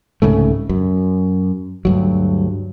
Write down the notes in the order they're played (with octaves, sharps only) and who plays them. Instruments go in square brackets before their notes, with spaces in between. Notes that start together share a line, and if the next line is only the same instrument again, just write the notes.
[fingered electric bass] C2 G#2 C#3 A3
F#2
D2 G2 F#3